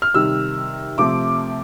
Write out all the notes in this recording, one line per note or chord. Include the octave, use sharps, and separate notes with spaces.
F6
C3 D#3 G3 E6
C3 F3 A3 C4 D6